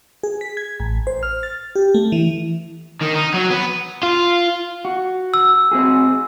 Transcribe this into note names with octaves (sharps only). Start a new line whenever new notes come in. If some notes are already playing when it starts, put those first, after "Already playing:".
G#4
B6
G#6
A1
C5
F6
A6
G4
A3
E3
D#3
D#4
F#3
B3
F4
F#4
E6
C4 F#4 G#4